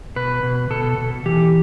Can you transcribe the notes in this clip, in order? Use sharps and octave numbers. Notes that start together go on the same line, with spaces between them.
B2 B4
B2
B2 A4
B2
E3 G4